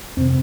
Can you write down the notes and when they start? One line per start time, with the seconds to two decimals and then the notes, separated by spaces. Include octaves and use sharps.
0.17 F2 C3 C4